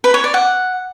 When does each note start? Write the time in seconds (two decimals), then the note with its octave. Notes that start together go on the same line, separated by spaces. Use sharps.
0.04 B4
0.14 C#5
0.24 D5
0.34 F#5